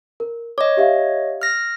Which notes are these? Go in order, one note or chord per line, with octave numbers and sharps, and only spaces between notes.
A#4
C#5 D#5 D6
G4 E5 F5
F6 A#6